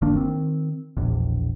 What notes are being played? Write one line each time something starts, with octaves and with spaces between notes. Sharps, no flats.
F#1 D#3 A#3 D4
D#3 C4
E1 A#1 E2